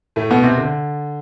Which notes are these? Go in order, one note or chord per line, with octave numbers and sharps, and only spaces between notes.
A2 A3
B2 B3
C3 C4
D3